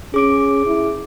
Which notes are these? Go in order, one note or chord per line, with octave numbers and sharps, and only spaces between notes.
C#4 G#4 D6 D7
E4